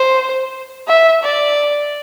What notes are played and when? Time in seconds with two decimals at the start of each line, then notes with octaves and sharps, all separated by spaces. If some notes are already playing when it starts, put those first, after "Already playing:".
Already playing: C5
0.88 E5
1.24 D5